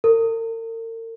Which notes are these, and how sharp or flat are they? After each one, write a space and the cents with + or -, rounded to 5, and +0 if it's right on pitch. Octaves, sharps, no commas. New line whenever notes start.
A#4 -45